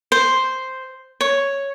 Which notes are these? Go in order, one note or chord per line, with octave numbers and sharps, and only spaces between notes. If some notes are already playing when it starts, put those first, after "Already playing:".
C5
C#5